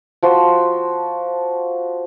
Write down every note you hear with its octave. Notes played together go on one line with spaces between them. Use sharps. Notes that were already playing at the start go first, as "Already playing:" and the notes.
F3 F#4 C5